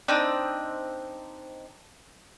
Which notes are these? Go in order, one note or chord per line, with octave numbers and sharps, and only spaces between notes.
C4 D4 D#4 E6